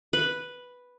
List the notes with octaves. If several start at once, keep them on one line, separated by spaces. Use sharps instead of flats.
B4